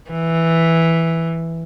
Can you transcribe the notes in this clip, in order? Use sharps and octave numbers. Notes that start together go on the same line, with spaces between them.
E3